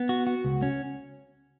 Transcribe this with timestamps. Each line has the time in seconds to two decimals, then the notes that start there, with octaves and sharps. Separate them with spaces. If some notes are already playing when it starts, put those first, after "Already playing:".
Already playing: B3
0.09 F#4
0.27 F#4
0.45 C#2
0.62 C#4